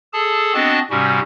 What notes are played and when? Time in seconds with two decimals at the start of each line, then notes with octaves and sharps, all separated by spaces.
0.13 G#4 A4 A5
0.54 B3 C4 D4 F#4 D#5 A5
0.90 G#2 C3 G3 C#4 F#4